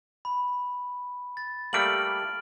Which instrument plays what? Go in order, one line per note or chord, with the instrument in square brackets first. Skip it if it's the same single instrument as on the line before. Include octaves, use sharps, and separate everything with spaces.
[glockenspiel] B5
A6
[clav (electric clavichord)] G3 A3 A#3 [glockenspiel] F6 D7 F#7